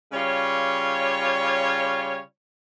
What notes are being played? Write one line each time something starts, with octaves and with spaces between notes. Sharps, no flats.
C#3 G3 F4 C#5